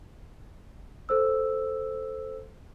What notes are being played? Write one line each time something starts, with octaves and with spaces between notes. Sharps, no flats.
A4 C5 E6